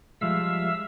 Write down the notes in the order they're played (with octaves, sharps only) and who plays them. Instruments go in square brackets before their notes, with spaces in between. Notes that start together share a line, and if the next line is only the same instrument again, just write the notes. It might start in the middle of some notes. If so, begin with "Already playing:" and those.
[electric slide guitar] F3 G3 G#3 [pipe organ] E5 F5 E6